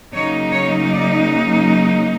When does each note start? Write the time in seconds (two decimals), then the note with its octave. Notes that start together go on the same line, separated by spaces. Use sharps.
0.13 C#3 F#3 A#3 D#4 C#5
0.53 C#5
0.92 D5